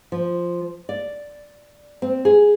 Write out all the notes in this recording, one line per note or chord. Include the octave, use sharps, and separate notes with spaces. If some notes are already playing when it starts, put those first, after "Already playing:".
F3
D5
C4
G#4